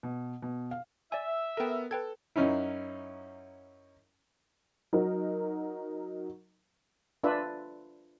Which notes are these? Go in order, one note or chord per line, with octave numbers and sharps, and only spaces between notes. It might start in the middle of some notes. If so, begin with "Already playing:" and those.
B2
B2
F5
D5 E5 G#5
B3 A4 A#4 G5
A4 B4 G5 G#6
F#2 C#4 D#4 E4
F#3 D#4 A#4
D4 F4 B4 E5